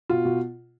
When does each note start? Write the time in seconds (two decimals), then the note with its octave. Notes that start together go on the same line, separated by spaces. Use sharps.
0.09 B2 F4
0.25 B2